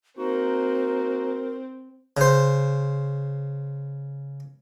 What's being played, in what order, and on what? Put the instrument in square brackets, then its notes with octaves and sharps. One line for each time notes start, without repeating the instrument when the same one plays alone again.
[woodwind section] A#3 D#4 F#4 [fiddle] C4 [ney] A#4
[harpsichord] C#3 C5